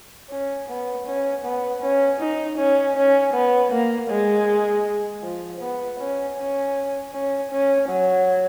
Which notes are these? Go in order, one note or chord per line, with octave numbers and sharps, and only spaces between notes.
C#4
B3
C#4
B3
C#4
D#4
C#4
C#4
B3
A#3
G#3
F3
B3
C#4
C#4
C#4
C#4
F#3